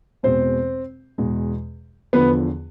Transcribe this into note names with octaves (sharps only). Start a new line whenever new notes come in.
E2 B2 G#3 C4 C5
E2 B2 G#3
E2 D3 F3 B3 B4